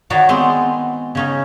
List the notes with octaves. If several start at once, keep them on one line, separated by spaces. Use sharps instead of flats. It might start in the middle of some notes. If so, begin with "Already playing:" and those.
D#3 D#4 F#4 C#5 D5
G#3 B3 C4 C6
C#3 C#4 D#4